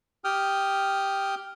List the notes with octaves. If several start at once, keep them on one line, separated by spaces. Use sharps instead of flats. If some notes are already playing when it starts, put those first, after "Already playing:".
G4 G5 D#6 F6